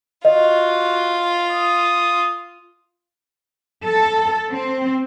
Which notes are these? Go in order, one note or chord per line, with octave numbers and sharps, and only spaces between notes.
F4 F#4 D#5
D#6
A4
C4